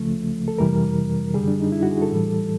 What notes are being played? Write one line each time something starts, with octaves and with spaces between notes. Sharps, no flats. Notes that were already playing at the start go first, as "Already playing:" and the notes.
Already playing: C#2 C#3 F3 A3
A4
F2 C3 E3 G3 A#4
F#2 D3 G3 G#4
D4
D#4
E4
F#4
G#4
A4
A2 E3 G3